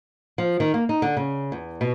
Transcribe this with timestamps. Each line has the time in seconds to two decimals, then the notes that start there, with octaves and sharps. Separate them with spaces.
0.38 F3
0.60 D#3
0.74 A#3
0.89 D#4
1.02 D3
1.17 C#3
1.52 E2
1.81 B2